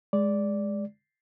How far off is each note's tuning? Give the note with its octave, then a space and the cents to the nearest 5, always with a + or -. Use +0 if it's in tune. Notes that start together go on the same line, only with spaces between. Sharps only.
G#3 +0 D5 -10